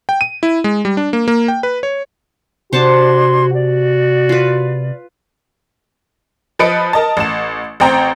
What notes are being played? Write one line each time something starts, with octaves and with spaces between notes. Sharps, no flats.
G5
D#7
E4
G#3
G3
D4
A#3
A#3
G5
B4
C#5
C3 D4 F#4 C5 F#5 A5 C6 G#6
F#4 D5
F4 B4
F3 B4 D#5 C#7 D7
A#4 D#5 A5
A1 E7
A1 C4 G5 A#5